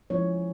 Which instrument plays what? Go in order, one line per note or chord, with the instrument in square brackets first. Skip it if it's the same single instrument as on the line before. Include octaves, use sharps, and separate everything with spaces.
[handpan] F3 G#3 C#4 E4 C#5